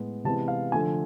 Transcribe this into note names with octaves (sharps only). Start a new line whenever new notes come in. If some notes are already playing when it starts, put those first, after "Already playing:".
Already playing: A2 G#3 B3
C3 E3 G#3 B3 E4 A5
F5
D3 F3 A3 G#5